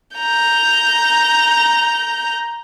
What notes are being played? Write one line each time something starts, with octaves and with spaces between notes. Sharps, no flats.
A#5 G6